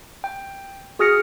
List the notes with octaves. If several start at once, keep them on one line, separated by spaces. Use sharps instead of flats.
G5
F#4 G#4 D#6 F6 A#6 C#7